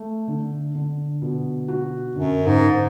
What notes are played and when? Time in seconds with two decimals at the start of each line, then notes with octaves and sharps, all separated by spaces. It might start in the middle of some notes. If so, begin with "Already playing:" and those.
Already playing: A3
0.28 D3
0.75 D3
1.22 B2
1.68 F#4
2.15 F#2 D3
2.46 G#2
2.62 D3